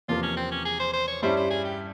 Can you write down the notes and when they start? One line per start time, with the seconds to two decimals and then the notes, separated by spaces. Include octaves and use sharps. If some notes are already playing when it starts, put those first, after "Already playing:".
0.08 E2 C3 F3 A#3 F4
0.23 C#4
0.37 C4
0.51 C#4
0.65 G#4
0.79 C5
0.93 C5
1.07 C#5
1.22 G2 G3 C#4 E4 C5
1.36 C5
1.50 G#4
1.65 G4